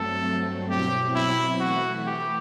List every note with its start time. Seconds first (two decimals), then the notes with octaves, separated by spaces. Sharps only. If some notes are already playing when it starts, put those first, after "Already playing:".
Already playing: G2 F#3 A3 C4 A4
0.70 B2 F#3 C4 E4 G4
1.15 E4
1.61 E3 A3 E4 F#4
2.07 G4